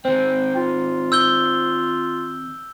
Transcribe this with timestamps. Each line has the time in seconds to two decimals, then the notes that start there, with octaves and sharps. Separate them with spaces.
0.05 D#3 C4 C5 G5
0.56 F4
1.12 E6 G6 G7